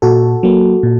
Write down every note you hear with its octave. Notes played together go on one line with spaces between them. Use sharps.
A#2 F#4 A4
F#3 A#3
A#2